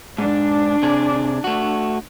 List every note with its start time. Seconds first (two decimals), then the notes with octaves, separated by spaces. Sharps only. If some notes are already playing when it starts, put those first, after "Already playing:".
0.18 G#2 D4
0.83 C3 G#4
1.44 A3 F#4